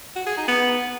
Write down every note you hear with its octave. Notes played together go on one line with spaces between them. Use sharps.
F#4
G#4
D#4
B3